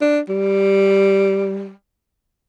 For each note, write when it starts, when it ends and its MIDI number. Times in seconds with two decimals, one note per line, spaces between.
0.01 0.20 62
0.29 1.71 55